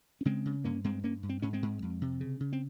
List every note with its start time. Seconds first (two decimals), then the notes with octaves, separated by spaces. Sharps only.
0.21 C#4
0.25 C#3 G#3 C4
0.45 C#3
0.64 G2 A#3 C#4
0.84 G2 G#3 C4
1.03 G2 A#3 C#4
1.23 G2
1.29 C4
1.42 G#2 C#4
1.53 G#3 C4
1.62 G#2
1.82 F2
2.02 C3
2.21 C#3
2.40 C#3
2.53 C4